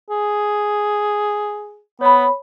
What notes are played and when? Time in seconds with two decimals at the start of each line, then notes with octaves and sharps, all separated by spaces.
0.10 G#4
2.01 B3 C#5 B5